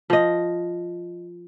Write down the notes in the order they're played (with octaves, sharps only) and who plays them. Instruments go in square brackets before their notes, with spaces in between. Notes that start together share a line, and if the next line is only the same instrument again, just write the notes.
[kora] F3 D#5